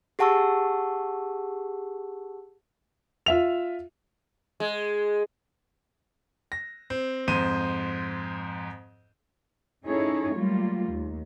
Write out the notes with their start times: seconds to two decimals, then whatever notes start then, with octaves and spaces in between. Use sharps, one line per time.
0.19 G4 G#4 F#5 A5 C#6 E6
3.26 F4 E5 F7
4.60 G#3
6.52 A#6
6.90 C4
7.28 F2 G#2 C5 D#7
9.86 C#4 D#4 E4 G#4 A4 C#5
10.33 F#3 G3 A3 A#3 F4
10.90 D#2